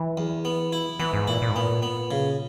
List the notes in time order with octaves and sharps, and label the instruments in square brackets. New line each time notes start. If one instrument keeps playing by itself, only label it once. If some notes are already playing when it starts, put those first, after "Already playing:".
Already playing: [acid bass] E3
[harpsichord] E2
B3
E4
[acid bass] E3 [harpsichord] B3
[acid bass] G#2
[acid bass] A#2 [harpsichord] E4
[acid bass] A#2
G#2
[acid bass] A#2 [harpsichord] B3
[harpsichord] B3
C#3